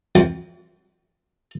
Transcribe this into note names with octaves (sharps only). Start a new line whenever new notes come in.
F2